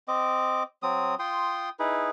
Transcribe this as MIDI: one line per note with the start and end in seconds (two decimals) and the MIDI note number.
0.08 0.63 60
0.08 0.63 75
0.08 0.63 86
0.83 1.15 54
0.83 1.15 60
0.83 1.15 87
1.19 1.70 65
1.19 1.70 79
1.19 1.70 84
1.19 1.70 87
1.79 2.10 63
1.79 2.10 64
1.79 2.10 68
1.79 2.10 71